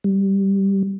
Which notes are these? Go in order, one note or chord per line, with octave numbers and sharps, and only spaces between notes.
G3